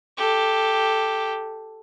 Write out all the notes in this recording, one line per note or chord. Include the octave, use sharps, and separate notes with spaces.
G4 A4